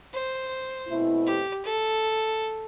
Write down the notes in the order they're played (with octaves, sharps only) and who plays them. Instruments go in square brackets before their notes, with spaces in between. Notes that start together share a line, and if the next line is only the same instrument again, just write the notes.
[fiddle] C5
[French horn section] B2 A3 C4 E4
[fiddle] G4
A4